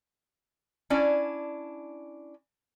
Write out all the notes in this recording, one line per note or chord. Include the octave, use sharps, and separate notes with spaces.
C#4 D4 E4 D5